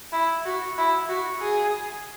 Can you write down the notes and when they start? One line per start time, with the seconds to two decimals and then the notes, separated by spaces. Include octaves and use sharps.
0.12 E4
0.45 F#4
0.77 E4
1.09 F#4
1.41 G#4